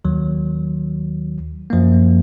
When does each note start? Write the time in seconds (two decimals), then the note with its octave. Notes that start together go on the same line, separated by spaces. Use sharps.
0.05 D#2 D#3 F#3
1.70 F#2 F3 A#3